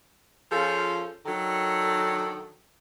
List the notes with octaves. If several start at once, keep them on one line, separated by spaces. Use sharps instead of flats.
F3 C#4 F4 G#4 A4
D#3 F#3 D4 A4